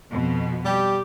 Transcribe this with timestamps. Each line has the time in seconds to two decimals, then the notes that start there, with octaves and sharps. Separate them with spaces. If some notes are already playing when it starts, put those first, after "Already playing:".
0.11 F2 B2
0.65 G3 G4